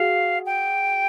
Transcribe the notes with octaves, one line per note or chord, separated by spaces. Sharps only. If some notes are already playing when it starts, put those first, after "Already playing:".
Already playing: F#4 G#4 F5
G5